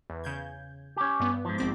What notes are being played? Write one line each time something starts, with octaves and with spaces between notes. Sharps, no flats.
E2
C#3 G6 G#6
C#4 G4
G2 B3
G#2 F3
A#1 C4 D6